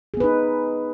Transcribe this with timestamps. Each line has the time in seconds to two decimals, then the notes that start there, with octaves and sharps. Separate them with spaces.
0.14 G#4
0.17 B3
0.20 B4
0.24 D#4